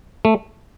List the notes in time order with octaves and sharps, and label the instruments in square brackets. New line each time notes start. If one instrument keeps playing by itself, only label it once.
[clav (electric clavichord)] A3